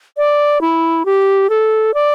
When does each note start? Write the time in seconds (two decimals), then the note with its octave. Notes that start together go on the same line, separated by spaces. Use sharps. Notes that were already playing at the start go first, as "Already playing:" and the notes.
0.17 D5
0.61 E4
1.06 G4
1.50 A4
1.94 D5